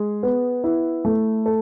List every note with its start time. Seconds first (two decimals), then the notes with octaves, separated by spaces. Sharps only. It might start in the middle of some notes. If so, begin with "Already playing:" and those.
Already playing: G#3 G#4
0.23 B3
0.64 E4
1.05 A3
1.46 A4